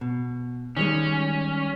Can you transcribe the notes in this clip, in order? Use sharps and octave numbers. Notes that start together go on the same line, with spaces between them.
B2
D#3 G3 G#3 C#4